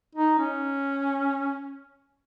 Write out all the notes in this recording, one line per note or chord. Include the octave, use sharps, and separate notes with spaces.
D#4
C#4